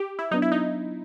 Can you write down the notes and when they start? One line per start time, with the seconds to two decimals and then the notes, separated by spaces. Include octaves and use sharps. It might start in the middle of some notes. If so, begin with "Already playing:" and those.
Already playing: G4
0.19 E4
0.31 F#3 B3 D4 D#4
0.42 E4
0.52 D#4